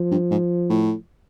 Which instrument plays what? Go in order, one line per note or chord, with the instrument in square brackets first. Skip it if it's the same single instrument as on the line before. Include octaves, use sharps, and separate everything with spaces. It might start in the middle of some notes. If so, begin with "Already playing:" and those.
Already playing: [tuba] F3
[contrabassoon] G2
G#2
A2